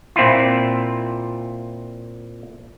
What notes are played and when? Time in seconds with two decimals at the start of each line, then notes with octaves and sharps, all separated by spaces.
0.16 A#2 C4 E4 F4